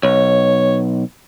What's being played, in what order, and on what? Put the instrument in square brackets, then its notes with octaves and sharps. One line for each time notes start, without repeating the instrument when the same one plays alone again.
[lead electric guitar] B1 [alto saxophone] C#5